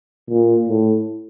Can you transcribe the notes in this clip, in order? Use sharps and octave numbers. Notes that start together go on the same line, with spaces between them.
A#2
A2